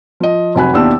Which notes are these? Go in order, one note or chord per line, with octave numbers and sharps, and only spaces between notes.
F3 D#5
F1 F#3 G#5 B5 F#6
D#2 B2 D4 E4 G4 E6